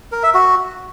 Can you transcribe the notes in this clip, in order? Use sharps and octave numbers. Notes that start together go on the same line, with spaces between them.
A#4
E5
F#4